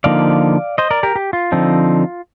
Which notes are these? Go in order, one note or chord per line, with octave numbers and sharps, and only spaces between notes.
D3 F3 A#3 D#4 D5 F5
C5 D#5
A#4 D5
G4 A#4
G4
F4
D3 F3 C4 D#4